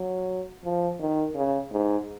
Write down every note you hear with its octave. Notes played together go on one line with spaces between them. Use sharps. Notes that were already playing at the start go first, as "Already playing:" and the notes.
Already playing: F#3
F3
D#3
C#3
G#2